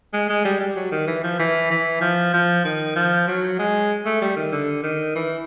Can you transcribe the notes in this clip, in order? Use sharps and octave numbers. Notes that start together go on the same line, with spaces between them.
G#3
G#3
G3
G3
F#3
D#3
E3
F3
E3
E3
F3
F3
D#3
F3
F#3
G#3
A3
G3
D#3
D3
D#3
E3